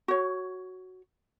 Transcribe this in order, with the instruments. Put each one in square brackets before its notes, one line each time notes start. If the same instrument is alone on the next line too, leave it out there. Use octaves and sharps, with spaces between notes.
[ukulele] F#4 C#5